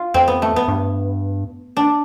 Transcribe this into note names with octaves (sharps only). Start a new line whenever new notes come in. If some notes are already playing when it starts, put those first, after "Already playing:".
Already playing: F4
F2 C4
B3
A3
B3
G2
D4